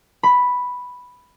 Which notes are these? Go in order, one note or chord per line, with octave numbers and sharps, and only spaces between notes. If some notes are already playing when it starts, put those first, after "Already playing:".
B5